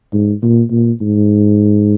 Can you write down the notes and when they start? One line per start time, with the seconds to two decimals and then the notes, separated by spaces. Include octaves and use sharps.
0.13 G#2
0.42 A#2
0.71 A#2
1.01 G#2